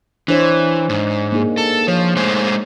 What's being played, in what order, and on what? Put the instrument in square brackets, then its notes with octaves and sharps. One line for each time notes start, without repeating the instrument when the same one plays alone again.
[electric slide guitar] E3 [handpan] D4 C5 C#5
[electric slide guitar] G#2
[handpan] A#3 D#4 G#4
[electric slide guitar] A4
[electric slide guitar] F3 [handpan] C#5
[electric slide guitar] G#3 A3 C5